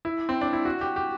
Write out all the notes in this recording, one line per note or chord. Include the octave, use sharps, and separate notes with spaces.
E4
C4
D4
E4
F#4
G4
G4